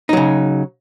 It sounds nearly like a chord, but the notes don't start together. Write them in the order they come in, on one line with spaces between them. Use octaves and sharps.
D#4 F#3 C#3